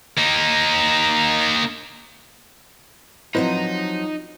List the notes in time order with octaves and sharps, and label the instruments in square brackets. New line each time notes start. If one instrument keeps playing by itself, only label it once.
[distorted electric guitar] A#3 D#4
[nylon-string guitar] F3 F#3 C4 [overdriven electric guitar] D#4 [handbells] E4 B4 C5